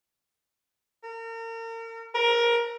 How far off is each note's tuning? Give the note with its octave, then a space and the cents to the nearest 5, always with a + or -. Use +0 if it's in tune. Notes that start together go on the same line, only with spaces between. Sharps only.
A#4 -35
A#4 +20